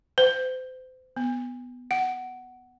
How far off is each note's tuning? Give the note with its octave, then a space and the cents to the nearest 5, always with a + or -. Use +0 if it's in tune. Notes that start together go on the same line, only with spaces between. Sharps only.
C5 -35
B3 +5
F#5 +10